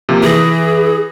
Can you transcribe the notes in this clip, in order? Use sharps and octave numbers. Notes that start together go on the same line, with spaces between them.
C3 F3 A#3
E3 G#4 A#6